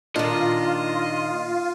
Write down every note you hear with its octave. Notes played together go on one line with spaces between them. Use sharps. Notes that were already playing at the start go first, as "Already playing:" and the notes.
A#2 D#3 D4 F4 D#5